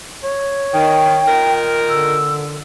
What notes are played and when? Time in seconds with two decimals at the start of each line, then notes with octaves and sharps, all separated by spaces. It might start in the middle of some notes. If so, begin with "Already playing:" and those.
0.24 C#5
0.73 D#3 G5
1.28 A#2 D#3 A#4
1.89 D3 E6